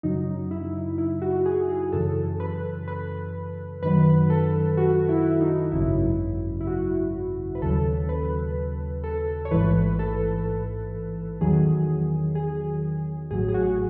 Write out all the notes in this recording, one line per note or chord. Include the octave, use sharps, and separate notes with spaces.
F#2 C#3 F#3 D#4
E4
E4
F#4
G#4
G#4
F#2 C#3 E3 A4
B4
B4
F#2 D#3 F#3 B4
A4
F#4
E4
D#4
G#1 F#2 C#3 F#3 E4
E4
F#4
B4
D#2 C#3 F#3 A4
B4
A4
C#5
A1 G#2 E3 B4
A4
E2 D#3 F#3 G#4
G#4
A1 A2 F#3 G#4
G#4
F#4